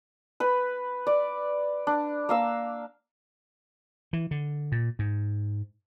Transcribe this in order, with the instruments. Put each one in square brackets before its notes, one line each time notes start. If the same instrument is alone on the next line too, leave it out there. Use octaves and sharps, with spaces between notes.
[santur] B4 B5
D5
D4
A#3 F5 E6
[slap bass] E3
D3
A#2
G#2